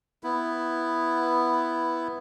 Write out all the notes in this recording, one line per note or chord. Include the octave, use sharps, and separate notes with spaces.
B3 E4